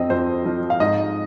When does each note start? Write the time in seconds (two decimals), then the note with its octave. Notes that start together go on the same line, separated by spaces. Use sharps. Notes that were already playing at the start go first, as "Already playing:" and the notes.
Already playing: F2 C4 D#5
0.10 F2 C5
0.46 F3
0.70 F5
0.80 G#2 D#5